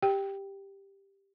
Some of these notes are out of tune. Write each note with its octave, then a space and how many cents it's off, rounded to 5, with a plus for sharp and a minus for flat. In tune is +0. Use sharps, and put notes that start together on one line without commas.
G4 +5 G5 +0